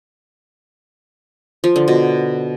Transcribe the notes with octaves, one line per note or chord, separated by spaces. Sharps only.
F3
D3
B2